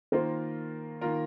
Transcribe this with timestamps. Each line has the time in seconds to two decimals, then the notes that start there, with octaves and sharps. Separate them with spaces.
0.12 D#3 A#3 F4 A#4 C5
1.01 D#3 A#3 F4 A#4